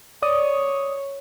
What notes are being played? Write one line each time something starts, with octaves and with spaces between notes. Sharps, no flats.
C#5 D5 D#6